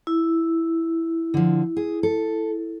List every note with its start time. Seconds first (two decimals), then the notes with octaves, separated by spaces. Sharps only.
0.07 E4
1.34 D3 F3
1.77 G#4
2.03 A4